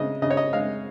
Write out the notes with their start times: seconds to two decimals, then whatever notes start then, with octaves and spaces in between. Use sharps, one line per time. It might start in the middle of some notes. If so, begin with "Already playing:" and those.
Already playing: C#3 G#3 D#5
0.22 C#3 D#5
0.31 C#5
0.37 D#5
0.53 G#3 F5